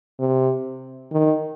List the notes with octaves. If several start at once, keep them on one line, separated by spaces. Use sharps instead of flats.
C3
D#3